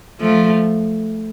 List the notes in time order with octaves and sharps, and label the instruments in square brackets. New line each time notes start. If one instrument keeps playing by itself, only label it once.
[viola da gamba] F3 A3